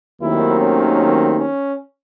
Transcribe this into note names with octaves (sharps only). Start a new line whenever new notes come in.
D#2 D#3 F#3 A3 C4 E4
C#4
C#4